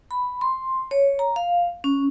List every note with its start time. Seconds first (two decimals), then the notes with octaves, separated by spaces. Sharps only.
0.11 B5
0.41 C6
0.91 C#5
1.19 A#5
1.36 F5
1.84 C#4